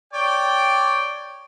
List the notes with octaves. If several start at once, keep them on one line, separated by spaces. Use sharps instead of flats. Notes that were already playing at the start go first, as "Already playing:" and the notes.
C#5 D5 G5